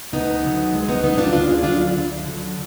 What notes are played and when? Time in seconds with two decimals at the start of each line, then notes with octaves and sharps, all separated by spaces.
0.13 D2 B3 D#4
0.43 D3 F#3
0.73 D2 G#3
0.89 B3 D#4
1.03 D3 F#3 B3 D#4
1.18 D4 F4
1.33 D2 D4 F4
1.49 F4 G#4
1.63 D3 F#3 D4 F4
1.94 D2
2.24 D3 F#3